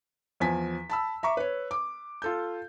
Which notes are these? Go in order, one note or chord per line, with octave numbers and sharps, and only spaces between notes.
E2 F3 G#5 B6
A5 B5 E6
E5 A#5 C#6 D6
B4 C#5
D6
F4 A4 G6